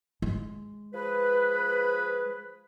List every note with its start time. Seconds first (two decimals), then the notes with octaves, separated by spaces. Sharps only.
0.22 G#3
0.94 F3 G#4 B4